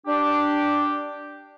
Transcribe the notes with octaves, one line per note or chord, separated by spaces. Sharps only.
D4 G4